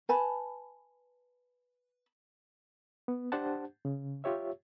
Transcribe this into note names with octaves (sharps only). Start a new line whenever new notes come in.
B4 G#5 A5 B5
B3
D4 G4 C5 F#5 A5
C#3
F4 G4 C#5 E5